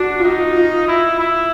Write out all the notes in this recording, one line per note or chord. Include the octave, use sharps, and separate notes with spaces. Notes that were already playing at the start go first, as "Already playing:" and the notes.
Already playing: D4 F#4
F4
D#4 F#4
F4
E4
E4